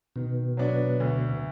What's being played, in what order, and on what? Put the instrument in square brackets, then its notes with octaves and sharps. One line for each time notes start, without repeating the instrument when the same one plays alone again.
[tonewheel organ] B2 [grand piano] D#3
[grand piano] F#3 B3 D4
D2